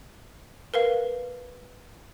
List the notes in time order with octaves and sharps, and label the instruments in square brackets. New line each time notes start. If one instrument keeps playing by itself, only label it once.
[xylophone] A#4 B4 F5